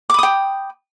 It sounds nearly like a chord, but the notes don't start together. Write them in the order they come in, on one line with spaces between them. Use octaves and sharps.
D6 B5 D#6 G5